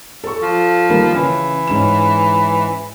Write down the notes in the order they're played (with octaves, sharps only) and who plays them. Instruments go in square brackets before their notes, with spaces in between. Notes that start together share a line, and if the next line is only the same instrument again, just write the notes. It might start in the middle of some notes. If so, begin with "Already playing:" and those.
[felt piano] A4 C#6
[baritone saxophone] F3
[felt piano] D#3 G3 A#3
[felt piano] C#3 [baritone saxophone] E3
[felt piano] G#2 C#4 E7